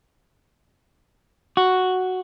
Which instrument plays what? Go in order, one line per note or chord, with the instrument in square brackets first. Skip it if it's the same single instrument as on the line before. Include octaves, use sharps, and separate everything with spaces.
[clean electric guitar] F#4